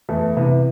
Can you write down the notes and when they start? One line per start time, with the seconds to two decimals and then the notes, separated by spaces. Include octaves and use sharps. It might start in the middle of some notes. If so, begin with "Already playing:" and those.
0.09 E2 A3
0.36 C3 E3 B3